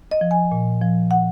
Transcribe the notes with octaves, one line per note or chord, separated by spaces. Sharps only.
D#5
F3
G#5
A#2
F3
F#5